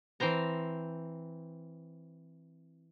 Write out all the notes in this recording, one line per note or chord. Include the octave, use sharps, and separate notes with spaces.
E3 C4 C5 A#5